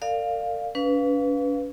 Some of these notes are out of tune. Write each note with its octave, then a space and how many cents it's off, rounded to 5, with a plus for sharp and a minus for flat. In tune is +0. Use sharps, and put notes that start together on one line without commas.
A#4 -45 D5 +30 F5 +0
C#4 +40 B4 +0 F5 +0